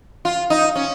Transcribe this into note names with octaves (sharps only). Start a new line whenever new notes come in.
F4
D#4
C#4